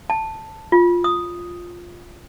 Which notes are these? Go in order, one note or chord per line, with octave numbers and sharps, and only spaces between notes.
A5
F4
D#6